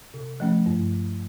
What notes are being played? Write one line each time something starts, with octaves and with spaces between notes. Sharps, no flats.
C3
F3 A3 C#4
G2